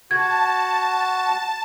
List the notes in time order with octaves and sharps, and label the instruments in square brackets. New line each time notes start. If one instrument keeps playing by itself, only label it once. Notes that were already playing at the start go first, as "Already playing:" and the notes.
[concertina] F#4 [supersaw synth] A5 [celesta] G#6